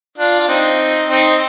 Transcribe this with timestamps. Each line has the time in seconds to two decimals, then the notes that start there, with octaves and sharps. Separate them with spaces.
0.18 D4 F4
0.39 F4
0.48 C4 D#4
1.08 C4 D#4